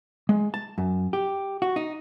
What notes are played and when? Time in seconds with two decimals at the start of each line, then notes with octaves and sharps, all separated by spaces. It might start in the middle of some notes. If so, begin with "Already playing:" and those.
0.29 G#3
0.54 A5
0.78 F#2
1.13 G4
1.62 F#4
1.76 D#4